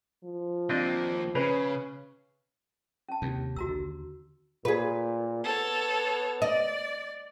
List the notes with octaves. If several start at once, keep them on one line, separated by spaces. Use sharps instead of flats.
F3
D#3 A#3 C4 D4 D#5
C#3 C#4 G#4 B4 A#5
C#4 A5
D#2 C3
B1 F#4 A#5 E6
D3
A#2 G#4 B4
B3 A4 C#5
D5 D#5